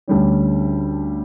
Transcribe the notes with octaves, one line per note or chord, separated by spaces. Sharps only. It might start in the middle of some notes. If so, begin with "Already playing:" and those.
D2 D3 G3 C#4